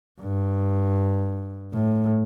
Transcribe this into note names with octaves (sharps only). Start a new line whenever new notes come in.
G2
A2